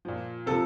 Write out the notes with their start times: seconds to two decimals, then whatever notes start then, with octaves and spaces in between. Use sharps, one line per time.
0.05 A#2 F3
0.46 C3 F3 A4